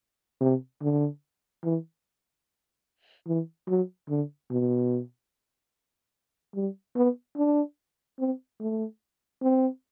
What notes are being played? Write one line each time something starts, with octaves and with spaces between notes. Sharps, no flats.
C3
D3
E3
E3
F#3
D3
B2
G3
B3
D4
C4
A3
C4